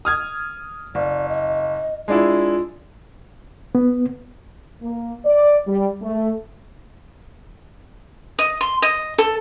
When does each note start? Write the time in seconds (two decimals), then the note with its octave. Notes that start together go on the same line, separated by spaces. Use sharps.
0.05 D#6 F6 G#6
0.95 F#1 D5
1.29 D#5
2.08 G#3 D4 E4 F4
3.75 B3
4.82 A#3
5.25 D5
5.67 G3
6.02 A3
8.39 D#5
8.61 C6
8.82 D#5
9.18 A4